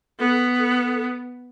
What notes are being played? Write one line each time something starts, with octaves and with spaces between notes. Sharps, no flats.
B3 A4
A4